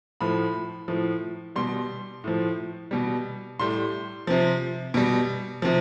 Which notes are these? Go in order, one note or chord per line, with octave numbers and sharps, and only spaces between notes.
A2 F3 B5
A2 F3
B2 G3 C6
A2 F3
B2 G3
A2 G3 C6
C3 F3
B2 G3
C3 F3